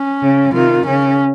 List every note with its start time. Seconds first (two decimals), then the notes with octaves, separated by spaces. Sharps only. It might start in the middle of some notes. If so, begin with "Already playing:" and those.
Already playing: C#4
0.21 C#3
0.53 C3 D#3 F4
0.86 C#3 C#4